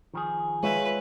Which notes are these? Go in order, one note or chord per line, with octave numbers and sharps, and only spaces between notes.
D#3 F3 G#4
G#3 F4 B4 C#5 E5 G#5